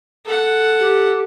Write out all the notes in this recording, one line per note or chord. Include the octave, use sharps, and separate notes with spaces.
A4 F#5
G4